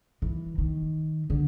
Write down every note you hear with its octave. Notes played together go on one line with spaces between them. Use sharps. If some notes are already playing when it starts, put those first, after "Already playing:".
E3
D#3
D3